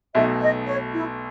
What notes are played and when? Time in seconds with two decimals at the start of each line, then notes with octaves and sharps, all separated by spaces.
0.14 B1 B2 A3 D#4 E5
0.41 D#5
0.67 C#5
0.94 E4